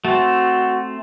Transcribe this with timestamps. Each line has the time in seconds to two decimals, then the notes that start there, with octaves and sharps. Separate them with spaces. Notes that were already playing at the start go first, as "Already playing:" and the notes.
0.05 A3 C4 F#4